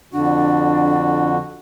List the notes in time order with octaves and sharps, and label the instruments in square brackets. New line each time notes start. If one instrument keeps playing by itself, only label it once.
[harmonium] F2 D3 F#4 [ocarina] D4